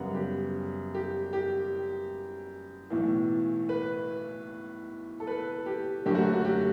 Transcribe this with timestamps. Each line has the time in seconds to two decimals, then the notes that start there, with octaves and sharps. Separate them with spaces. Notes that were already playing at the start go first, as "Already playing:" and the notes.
Already playing: F#2 C#3 G3 B3 F#5
0.15 G4
0.94 G4
1.33 G4
2.90 B1 A2 E3
3.69 B4
5.20 A4
5.27 B4
5.66 G4
6.06 F#1 F#2 D3 F#3 A3 G4
6.15 F#4
6.32 F#4
6.45 G4